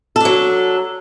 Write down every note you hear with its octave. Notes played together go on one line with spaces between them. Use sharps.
F#3 D4 A4